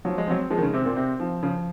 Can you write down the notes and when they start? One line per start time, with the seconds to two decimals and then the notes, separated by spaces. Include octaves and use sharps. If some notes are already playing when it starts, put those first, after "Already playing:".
0.05 F3 F#3
0.18 G#3
0.27 F#3 C4
0.50 F3 G#3
0.58 D#3
0.62 C#3
0.73 C3 C4
0.85 A#2
0.96 C3 C4
1.20 F3
1.43 C#3 F3